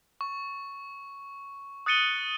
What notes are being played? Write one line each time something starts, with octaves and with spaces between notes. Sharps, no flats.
C#6
D#6 F#6 A6 C#7 D#7 G7